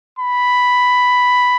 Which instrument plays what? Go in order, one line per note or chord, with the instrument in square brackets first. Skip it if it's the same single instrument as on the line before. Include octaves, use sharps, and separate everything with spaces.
[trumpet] B5